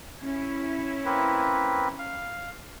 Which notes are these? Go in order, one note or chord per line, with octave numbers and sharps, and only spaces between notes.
C#4 E4
A#3 C4 B4
F5